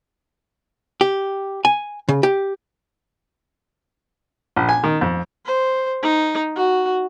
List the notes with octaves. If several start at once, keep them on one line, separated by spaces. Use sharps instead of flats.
G4
G#5
C#3
G4
A#1
G#5
D#3
F2
C5
D#4
F#4